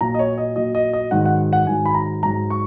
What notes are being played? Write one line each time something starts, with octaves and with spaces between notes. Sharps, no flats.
A#2 F#3 A#5
D#5
C#5
D#5
A#2 F#3 D#5
D#5
D#5
G#2 D#3 F#3 F#5
F#5
F#5
G#2 D#3 F#3 G#5
B5
A#5
G#2 F#3 A#5
C#6